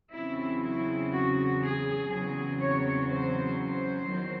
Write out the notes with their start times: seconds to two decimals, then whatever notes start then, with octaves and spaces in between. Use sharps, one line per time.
0.13 E2 C#3 F#3 C4 E4
0.63 E4
1.12 F#4
1.61 G#4
2.10 E2 C#3 F#3 C4 G#4
2.59 C#5
3.09 C5
3.57 C5
4.07 E2 D#3 F#3